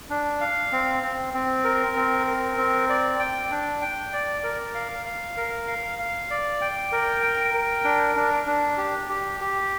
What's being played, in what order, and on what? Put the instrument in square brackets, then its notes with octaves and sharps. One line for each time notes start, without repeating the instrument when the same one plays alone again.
[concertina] D4
F5
C4
C4
C4
A#4
C4
A#4
C4
D5
G5
D4
G5
D5
A#4
F5
F5
A#4
F5
F5
D5
G5
A#4
G5
A#4
D4
D4
D4
G4
G4
G4